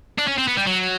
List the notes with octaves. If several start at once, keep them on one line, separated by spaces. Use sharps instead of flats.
D4
C#4
C4
B3
G3
F#3